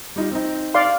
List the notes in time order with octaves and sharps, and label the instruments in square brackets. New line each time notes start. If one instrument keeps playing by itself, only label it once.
[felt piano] G3 D#4 F4
C4 D#4
[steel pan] D5 F5 C6